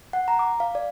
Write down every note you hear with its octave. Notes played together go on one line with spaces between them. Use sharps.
F#5
A#5
D6
F5
D5